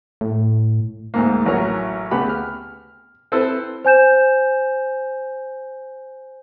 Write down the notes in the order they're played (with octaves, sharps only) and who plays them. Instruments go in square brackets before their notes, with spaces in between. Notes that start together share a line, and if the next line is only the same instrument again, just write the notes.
[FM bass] A2
[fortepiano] D2 G#2 A#3
A1 F#3 E4 A#4 C#5
D2 C#3 B3 G4 B5
F6
C4 E4 A4 B4 C5
[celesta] C5 G#5 G6 E7